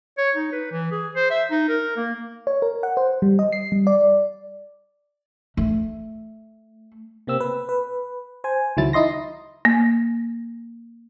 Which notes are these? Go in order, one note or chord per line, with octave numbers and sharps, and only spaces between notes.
C#5
D#4
B4
E3
G#4
C5
E5
D#4
A#4
A#3
C#5
A#4
F#5
C5
G3
D#5
C7
G3
D5
A3
C3 A#3 C4 E6
B4
B4
C5 G#5
C#2 D#3 F#3 E4 A6
D#4 E4 D#5 C6 A#6
A#3